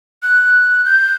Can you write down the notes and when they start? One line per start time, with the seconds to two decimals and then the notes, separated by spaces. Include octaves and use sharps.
0.23 F#6
0.85 G6